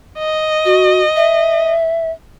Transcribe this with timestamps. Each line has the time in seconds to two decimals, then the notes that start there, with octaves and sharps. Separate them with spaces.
0.19 D#5
0.65 F#4
1.16 E5